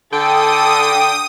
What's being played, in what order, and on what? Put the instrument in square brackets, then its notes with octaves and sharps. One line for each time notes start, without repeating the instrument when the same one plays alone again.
[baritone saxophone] D3 [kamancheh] A4 [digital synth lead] G5 [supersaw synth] D#6